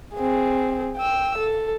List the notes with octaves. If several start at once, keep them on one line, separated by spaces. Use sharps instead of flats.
C4 G#4
G5 E6
A4